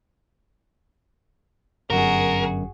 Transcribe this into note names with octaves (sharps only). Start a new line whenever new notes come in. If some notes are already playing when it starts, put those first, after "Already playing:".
G1 F#2 F#4 G#4 A#4